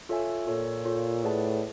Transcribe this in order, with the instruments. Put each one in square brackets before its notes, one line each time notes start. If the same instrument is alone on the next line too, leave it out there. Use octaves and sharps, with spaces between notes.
[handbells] F4 A4 C#5 E5 G#5
[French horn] A#2 [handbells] F4 A4 C#5
[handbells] F4 A4 C#5
[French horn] A2 [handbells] G#4 B4 D5 F#5 A5